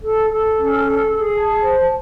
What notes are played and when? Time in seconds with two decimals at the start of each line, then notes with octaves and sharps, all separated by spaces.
0.03 A4
0.30 A4
0.57 C#4
0.83 A4
1.09 G#4
1.35 A5
1.61 C5